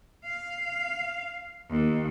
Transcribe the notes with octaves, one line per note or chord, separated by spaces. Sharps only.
F5
D#2